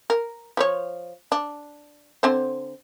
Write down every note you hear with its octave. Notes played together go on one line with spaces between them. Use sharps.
A#4
F3 B4 C#5
D4
D3 C4 C5